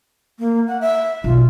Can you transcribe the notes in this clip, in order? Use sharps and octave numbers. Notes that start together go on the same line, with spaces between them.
A#3
F#5
E5
B1 F4